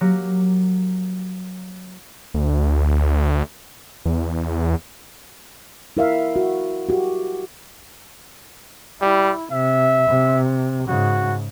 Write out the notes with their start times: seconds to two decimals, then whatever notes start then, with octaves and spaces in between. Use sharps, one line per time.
0.01 F#3 A#3 G4
2.34 D2
4.05 E2
5.97 E4 A#4 E5 F5
6.36 F#4
6.89 F#4 G4
9.02 G3 E4
9.52 C3 E5
10.08 C3
10.88 G#2 C#3 F#4